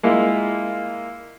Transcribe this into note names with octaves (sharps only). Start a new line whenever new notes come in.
G#3 A#3 E4 F4